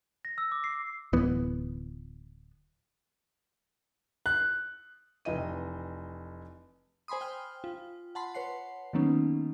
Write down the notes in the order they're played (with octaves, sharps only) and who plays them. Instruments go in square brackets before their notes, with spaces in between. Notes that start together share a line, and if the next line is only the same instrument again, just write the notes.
[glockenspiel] A#6
E6
D6
C7
[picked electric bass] D1 E3 B3
[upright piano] F#6
[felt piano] F1 E3 D#5 D#7
[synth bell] C5 G#5 B5 C6 D#6
G5 F6
F4
F#5 A5 B5 C6
B4 C#5 F#5 C7
D#3 F#3 A#3 B3 C#4 D#4